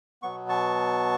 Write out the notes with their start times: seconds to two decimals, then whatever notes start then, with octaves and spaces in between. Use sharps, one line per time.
0.23 B2 F#3 B3 C#6
0.49 A5 C#6